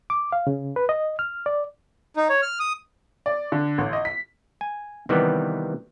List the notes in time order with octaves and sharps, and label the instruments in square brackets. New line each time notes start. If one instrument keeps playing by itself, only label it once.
[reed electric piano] D6
F5
C#3
B4
D#5
F6
D5
[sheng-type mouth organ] D#4
C#5
F6
D#6
[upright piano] D5
D3
A1
D#5
B6
[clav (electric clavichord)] G#5
C3 D#3 E3 G3 B3